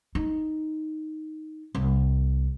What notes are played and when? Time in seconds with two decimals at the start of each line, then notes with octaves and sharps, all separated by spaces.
0.15 D#4
1.75 C2